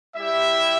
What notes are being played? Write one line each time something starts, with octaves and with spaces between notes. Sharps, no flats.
G3 E4 G4 E5